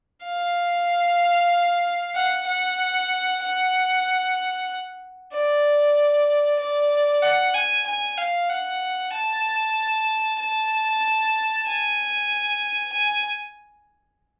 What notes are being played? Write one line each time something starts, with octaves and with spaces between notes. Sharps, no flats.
F5
F#5
F#5
F#5
D5
D5
F#5
G#5
G#5
F5
F#5
A5
A5
G#5
G#5